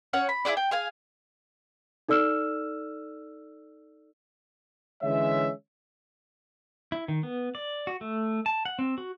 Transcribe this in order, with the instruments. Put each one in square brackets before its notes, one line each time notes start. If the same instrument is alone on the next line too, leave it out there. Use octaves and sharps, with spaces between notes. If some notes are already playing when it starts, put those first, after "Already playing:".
[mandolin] C#4 C#5 F#5
B5
E4 F#4 G#4 D5
G5
G#4 F5 G#5
[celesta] D#4 A4 D5 E6 F6 E7
[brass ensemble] D3 E3 G#3 C#4 C#5 E5
[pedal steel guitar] E4
D#3
B3
D5
F#4
A3
A5
F#5
C4
F#4